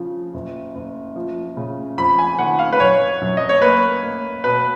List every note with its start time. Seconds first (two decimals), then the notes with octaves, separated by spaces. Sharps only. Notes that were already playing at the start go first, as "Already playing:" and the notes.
Already playing: C#3 F3
0.34 F#1
0.75 F#1
1.16 F3
1.57 C#3
1.98 F2 B5
2.19 G#5
2.39 D#3 F#5
2.59 F5
2.73 B4
2.80 F#2 C#5
3.21 F#2
3.37 D#5
3.49 C#5
3.62 A#3 B4
4.03 A#3
4.44 B2 B4